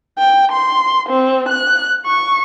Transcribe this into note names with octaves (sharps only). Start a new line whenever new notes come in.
G5
C6
C4
F#6
C#6